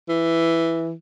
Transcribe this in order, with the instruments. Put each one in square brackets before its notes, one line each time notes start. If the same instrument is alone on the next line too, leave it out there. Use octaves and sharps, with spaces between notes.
[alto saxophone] E3